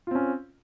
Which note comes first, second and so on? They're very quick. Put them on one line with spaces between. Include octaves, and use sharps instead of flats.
F4 C4 C#4